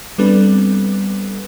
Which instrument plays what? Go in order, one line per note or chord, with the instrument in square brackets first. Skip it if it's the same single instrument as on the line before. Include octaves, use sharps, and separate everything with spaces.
[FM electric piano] G3 B3 C4 D4 A4 B4